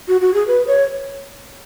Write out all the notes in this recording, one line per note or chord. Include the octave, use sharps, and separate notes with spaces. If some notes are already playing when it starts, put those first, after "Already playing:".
F#4
F#4
G#4
B4
C#5